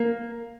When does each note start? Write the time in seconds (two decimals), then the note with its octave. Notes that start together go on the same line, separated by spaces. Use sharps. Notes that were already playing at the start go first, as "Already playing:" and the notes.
Already playing: A#3